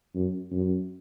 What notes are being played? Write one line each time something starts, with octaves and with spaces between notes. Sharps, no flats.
F#2
F#2